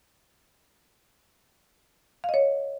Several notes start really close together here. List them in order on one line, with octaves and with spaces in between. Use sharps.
F5 D#5 C#5